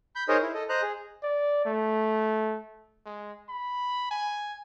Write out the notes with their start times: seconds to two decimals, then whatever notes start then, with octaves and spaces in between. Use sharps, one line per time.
0.16 B5 G6
0.29 D#4 G#4 A#4 C5 C#5 D#5
0.42 E4
0.54 A4 D#5
0.69 C5 D#5 A#5 F#6
0.82 G#4
1.23 D5
1.65 A3
3.05 G#3
3.49 B5
4.11 G#5